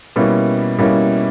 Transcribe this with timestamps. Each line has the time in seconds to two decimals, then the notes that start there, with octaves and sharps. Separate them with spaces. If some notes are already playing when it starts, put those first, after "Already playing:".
0.16 B2 G3 A#3 C#4 E4
0.79 B2 G3 A#3 C#4 E4